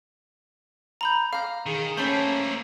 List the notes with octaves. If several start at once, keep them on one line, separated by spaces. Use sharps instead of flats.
A#5 B5 G6
F5 A#5 F6
D#3 G#4
A3 A#3 C#4 C5 A5 B5